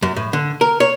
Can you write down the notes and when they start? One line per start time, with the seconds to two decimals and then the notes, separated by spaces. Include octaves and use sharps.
0.02 F#2
0.16 A2
0.33 D3
0.61 A#4
0.80 C#5